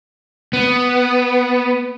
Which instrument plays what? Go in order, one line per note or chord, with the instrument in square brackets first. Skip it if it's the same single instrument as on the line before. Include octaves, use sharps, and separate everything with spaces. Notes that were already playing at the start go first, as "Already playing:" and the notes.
[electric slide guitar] B3